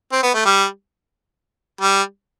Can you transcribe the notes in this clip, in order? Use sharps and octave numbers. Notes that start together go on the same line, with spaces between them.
C4
B3
A3
G3
G3